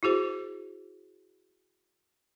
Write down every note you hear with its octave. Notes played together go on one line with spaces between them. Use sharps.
E4 F#4 G#4 C5